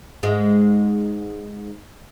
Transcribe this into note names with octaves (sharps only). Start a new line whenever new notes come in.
G#2 G#3